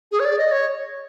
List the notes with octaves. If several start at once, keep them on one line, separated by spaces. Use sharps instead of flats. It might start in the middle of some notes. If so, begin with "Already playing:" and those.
G#4
C#5
D5
D#5
C#5